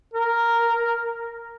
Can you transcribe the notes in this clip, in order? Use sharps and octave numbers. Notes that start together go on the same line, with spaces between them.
A#4